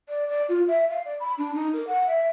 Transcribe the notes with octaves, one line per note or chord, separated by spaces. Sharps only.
D5
D5
F4
E5
F5
D5
B5
D4
D#4
A#4
F#5
E5